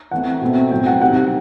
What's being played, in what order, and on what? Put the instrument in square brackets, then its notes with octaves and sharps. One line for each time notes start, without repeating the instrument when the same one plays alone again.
[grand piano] E3 A3 C4 F#5
B2 A3 C4
A2 F#3 C4 G5
F#5
C3 D#3 G3 C4 F#5